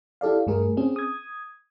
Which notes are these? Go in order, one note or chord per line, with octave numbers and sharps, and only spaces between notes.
E4 G4 A4 D5 F5
G2 A3 G#4 A#4
C4 C#4 G#4
D#6 G#6